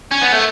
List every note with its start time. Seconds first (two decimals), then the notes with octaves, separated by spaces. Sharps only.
0.11 C#4
0.21 B3
0.32 A3